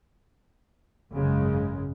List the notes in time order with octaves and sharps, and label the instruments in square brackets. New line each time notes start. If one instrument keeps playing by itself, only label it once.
[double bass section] G#1 F#2 C#3 G#3